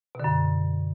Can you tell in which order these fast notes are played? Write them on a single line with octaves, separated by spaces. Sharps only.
B2 D3 F#2